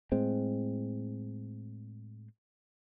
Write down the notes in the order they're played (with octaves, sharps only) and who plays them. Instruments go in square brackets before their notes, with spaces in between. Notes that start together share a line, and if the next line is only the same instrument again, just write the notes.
[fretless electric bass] A2 G#3 C4